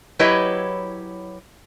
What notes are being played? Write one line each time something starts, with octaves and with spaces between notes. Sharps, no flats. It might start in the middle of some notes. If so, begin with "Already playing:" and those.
F#3 E4 G4 B4 C#5 D#5